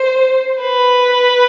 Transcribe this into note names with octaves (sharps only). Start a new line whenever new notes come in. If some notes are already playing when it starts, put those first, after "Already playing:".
Already playing: C5
B4